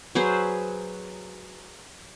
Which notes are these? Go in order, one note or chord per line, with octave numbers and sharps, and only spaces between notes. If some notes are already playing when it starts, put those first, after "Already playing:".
F#3 G#4 B4 C5